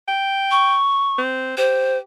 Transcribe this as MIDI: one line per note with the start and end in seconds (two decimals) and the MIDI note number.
0.08 0.77 79
0.51 1.20 85
1.18 1.57 60
1.57 2.00 67
1.57 1.97 72